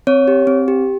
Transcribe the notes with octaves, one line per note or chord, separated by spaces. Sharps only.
C4 C#5
G4
C4
G4